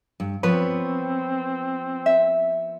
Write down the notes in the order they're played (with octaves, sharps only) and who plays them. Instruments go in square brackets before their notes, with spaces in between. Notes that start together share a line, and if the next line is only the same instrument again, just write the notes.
[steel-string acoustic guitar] G2
[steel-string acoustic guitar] F3 B3 C#5 [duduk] C4 [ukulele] B4
[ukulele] E5